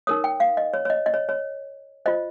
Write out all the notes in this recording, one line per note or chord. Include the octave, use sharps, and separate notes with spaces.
D#4 A#4 C#5 D#6
G5
F5
D#5
C#5
C#5
D#5
D#5
C#5
C#5
F4 C5 D#5